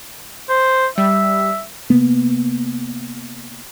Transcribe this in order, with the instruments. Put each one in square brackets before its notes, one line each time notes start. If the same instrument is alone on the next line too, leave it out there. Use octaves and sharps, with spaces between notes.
[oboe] C5
[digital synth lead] G3 [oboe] E5
[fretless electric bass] C3 A#3 B3